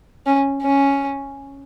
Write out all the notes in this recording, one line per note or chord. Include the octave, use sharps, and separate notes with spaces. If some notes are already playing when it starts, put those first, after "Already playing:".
C#4
C#4